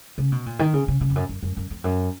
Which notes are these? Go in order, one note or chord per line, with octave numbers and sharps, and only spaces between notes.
C#3
B2
A#2
D#3
C#3
C#3
C#3
F2
F#2
F#2
F#2
F#2
F2
F#2